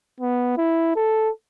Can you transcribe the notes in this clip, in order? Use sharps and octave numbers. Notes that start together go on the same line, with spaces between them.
B3
E4
A4